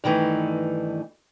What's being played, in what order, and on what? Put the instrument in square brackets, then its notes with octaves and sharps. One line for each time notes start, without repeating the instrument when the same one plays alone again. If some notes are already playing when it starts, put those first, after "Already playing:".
[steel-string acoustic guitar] G2 D#3 E3 A3 D#4